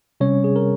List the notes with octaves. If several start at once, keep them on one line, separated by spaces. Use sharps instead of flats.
C3 G3 C#4 C#5
G#4
A#4